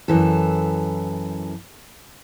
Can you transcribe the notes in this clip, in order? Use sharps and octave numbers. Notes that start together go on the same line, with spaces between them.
F#2 E3 A4